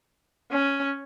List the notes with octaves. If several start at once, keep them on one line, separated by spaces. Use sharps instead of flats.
C#4